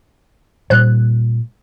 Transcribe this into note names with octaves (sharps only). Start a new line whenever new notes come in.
A#2 G3 C5 F#6